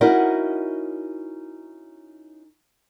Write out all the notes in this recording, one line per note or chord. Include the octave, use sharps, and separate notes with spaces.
C#4 D#4 E4 F#4 A#4 D#5